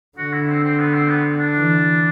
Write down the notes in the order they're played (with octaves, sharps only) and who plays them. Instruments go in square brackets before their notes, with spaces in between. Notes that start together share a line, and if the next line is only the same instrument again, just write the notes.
[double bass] D3 [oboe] F#4
[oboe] E4
C4
C4
B3
C4
B3
D4
[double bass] E3